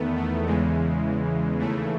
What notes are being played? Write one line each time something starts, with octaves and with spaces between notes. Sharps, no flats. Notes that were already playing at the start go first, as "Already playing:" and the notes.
Already playing: E2 D#3 A3 B3
A3
E2 C#3 E3 G#3
D#2 C#3 E3 A3